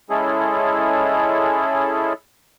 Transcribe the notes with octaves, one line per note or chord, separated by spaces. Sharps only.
G#3 C#4 E4 G#4 A4